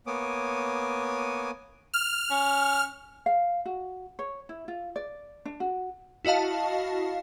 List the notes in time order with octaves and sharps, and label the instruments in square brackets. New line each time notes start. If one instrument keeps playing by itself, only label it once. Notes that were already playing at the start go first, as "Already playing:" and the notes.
[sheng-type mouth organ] A#3 B3 C#5 G#5 D6 D#6
[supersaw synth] F6
[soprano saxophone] C#4
[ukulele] F5
F#4
C#5
E4
F4
D5
D4
F#4
[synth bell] E4 F#4 D#5 F5 A5